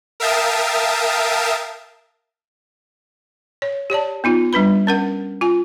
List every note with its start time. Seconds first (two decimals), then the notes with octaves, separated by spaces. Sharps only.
0.20 A#4 E5 F5 G5 A5 D#6
3.62 C#5
3.90 G4 C#5 D5 A5
4.24 B3 D#4 F4
4.53 G3 D4 B4 B5
4.87 C#4 A#4 F#5
5.41 F4 G#5